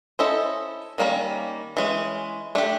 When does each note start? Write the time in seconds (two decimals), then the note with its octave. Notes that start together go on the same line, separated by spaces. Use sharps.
0.19 C#4 E4 A4 C5 D#5
0.98 D#3 G3 A#3 C#4
1.77 E3 G#3 C#4
2.55 A3 D4 G4